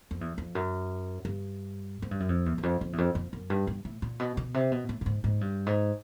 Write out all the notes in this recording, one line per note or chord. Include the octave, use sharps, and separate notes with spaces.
F2
E2
F2
F#2
G2
G#2
G2
F#2
F2
E2
E2
F2
F2
E2
F2
F2
F#2
G2
G2
A2
A#2
B2
B2
C3
B2
A2
A2
G#2
G#2
G2
G#2